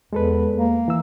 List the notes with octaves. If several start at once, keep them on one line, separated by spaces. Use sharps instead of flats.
E2 G#3 A4 B4
A#3
E3 E6